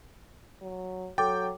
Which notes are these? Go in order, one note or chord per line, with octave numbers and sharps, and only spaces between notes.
F#3
F#3 A4 G5 D6 A6